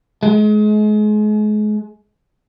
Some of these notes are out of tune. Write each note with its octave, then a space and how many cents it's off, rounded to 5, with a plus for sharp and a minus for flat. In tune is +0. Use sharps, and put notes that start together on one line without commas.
G#3 +35